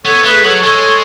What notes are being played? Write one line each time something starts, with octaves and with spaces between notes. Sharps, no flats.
B3 A4 C#5
A3 G#4 B4
F#3 A4 C#5
G#3 A4 C#5